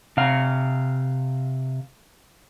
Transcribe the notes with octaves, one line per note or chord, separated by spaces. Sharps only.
C3 F5